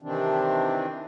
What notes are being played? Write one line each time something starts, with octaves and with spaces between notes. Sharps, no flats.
C3 D#3 E3 C4 D4